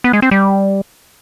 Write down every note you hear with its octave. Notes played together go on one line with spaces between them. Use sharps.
B3
G#3
C4
G3